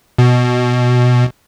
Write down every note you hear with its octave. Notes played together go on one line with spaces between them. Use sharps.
B2